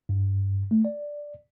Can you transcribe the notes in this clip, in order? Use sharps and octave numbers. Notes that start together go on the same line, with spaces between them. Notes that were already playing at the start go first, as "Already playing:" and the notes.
G2
A3
D5